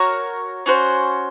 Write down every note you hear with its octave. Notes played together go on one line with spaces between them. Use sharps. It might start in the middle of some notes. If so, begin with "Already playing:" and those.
Already playing: F#4 A#4 C#5
C#4 F#4 C5